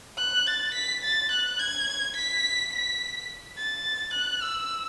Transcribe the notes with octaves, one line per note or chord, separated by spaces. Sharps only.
F#6
A6
B6
A6
F#6
G#6
B6
B6
A6
F#6
E6